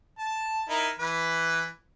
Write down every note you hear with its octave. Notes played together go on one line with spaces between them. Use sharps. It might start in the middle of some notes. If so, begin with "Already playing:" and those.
A5
D#4 E4 A#4
E3 B4